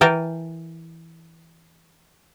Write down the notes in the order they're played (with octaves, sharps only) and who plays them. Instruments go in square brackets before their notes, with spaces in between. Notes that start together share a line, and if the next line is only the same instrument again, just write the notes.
[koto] E3 A#4 G5 A5